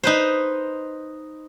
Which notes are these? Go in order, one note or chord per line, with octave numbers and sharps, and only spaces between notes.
D#4 B4 C5